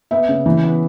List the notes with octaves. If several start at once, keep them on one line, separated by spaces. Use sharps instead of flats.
B3 E5
C#3
E3
B3